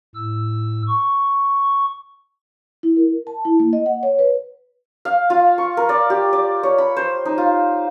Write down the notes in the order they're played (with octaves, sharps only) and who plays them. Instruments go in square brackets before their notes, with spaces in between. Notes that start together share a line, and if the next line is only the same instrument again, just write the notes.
[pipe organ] A2 E6
C#6
[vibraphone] E4
A#4
A5
E4
A#3
D#5
F#5
C#5
B4
[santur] F5
F4
C#6
A#4
D5
G4
D5
C#5
B5
C5
D#4
F4